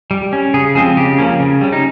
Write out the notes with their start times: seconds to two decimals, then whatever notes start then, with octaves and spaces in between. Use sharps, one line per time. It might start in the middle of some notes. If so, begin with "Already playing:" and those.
0.11 G3
0.33 C#4
0.54 C#3 G#4
0.75 F3 G#3 C4 G#4
0.97 C#3 G4
1.18 F3 A#3 C#4
1.40 C#3
1.61 G3 C#4
1.73 D#4